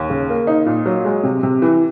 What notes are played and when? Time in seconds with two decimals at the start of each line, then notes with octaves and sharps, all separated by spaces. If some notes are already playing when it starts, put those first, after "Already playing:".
Already playing: D#2
0.10 C#3
0.29 A#3
0.47 D#4
0.66 A#2
0.86 F#3
1.05 G#3
1.23 C3
1.43 C3
1.62 E3